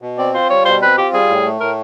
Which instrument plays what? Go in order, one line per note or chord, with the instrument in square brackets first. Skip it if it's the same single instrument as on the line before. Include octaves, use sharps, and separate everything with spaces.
[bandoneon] B2
[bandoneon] C4 [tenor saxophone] D5
[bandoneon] F4 [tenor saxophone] C5
[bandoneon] G3 [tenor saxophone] C#5
[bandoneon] B2 [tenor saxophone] C5
[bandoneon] C4 [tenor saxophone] B4
[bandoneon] F4 [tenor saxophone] G4
[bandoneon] G3 [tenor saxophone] G#4
[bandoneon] A2
A3
[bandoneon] A2 [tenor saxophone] A#4